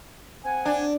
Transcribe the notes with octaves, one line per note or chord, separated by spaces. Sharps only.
C4 F#5 G#5
D4